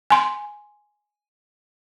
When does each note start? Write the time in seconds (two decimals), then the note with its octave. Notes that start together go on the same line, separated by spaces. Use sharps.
0.10 G#5 C6